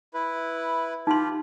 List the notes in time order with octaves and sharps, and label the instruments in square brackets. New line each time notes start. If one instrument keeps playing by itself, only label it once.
[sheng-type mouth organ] E4 B4
[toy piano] D#4 C6 [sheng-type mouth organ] F4 G4